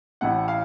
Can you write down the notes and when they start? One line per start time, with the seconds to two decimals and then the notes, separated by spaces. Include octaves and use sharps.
0.21 A1 A2 A3 F#5
0.48 F5